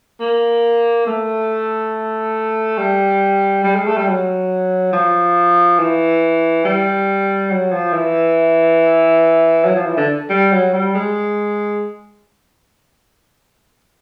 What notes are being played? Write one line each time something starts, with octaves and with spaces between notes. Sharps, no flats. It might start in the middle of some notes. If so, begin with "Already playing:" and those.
A#3
A3
G3
G3
G#3
A3
G3
F#3
F3
E3
G3
F#3
F3
E3
F#3
F3
E3
D3
G3
F#3
G3
G#3